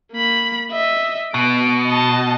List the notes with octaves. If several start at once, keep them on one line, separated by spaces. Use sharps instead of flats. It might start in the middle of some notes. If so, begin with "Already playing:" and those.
A#3 B5
D#5 E5
B2 B3 D7
D#5 A5